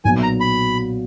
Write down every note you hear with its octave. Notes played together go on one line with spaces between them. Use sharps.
B1 A#2 F#3 B3 G#5
A#5
B5